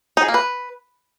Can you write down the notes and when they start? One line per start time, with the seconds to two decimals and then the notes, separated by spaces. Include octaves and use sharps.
0.17 D#4
0.23 G#4
0.28 A#3
0.34 B4